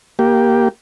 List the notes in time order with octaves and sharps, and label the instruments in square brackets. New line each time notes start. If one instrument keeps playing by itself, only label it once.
[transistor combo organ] A#3 G4